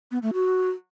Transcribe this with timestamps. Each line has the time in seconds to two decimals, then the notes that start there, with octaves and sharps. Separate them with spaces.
0.11 B3
0.22 A3
0.34 F#4